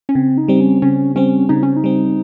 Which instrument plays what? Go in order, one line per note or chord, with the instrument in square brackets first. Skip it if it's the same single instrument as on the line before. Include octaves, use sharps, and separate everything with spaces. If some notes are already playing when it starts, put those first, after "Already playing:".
[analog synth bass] C#4
[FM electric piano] C#3 [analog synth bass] C4
[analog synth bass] D#4
[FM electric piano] G3 C4
[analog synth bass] C#4
[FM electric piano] C#3 [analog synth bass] C#4
[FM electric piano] G3 C4 [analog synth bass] C#4
[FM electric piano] C#3 [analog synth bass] D#4
[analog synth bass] C#4
D#4
[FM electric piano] G3 C4